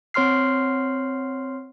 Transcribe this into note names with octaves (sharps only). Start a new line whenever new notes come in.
C4 C#5 C6 F6 C7